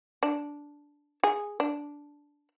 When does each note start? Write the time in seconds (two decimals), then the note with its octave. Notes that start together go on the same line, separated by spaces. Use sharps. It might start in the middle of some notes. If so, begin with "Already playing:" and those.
0.23 D4
1.24 G#4
1.60 D4